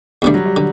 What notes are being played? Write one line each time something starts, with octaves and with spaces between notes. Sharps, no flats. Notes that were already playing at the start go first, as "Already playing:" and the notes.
E2 D3 G3 A3 D4
F#3
G3
D3